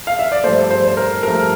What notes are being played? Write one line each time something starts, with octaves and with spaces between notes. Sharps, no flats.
F5
E5
D5
G2 F3 A3 C5
C5
C5
A#4
G2 F3 A3 A#4